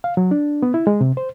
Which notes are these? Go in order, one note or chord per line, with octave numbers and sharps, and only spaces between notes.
F5
F#3
D4
B3
E4
G#3
C3
C5